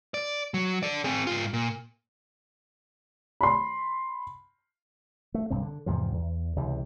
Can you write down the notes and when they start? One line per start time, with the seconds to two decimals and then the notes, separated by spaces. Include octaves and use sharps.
0.14 D5
0.54 F#3
0.83 A4 D5
1.05 C4 G#4
1.27 G#2 F4
1.53 A#2
3.41 B5 C6
5.34 A3
5.50 B1 G2 C4
5.62 D3
5.86 E2 G#2 C3 F3
6.13 E2
6.56 C#2 C3 E3